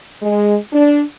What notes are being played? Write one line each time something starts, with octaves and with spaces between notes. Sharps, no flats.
G#3
D4